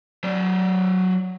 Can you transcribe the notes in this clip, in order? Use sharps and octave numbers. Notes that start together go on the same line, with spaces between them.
F#3 D5